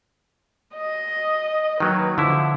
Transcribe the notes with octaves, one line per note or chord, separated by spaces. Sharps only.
D#5
D#3 F#3 A#3 B4
D3 F3 E4